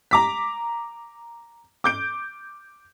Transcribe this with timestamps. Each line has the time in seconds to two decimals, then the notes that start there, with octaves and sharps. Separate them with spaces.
0.11 A#5 D6 B6
1.84 D6 G6 D7